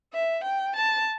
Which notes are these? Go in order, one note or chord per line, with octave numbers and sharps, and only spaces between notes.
E5
G5
A5